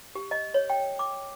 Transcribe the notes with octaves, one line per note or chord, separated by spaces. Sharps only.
G4
D#5
C#5
G5
D6